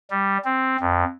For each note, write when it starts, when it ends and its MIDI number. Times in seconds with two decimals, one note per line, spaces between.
0.10 0.38 55
0.45 0.77 60
0.80 1.04 41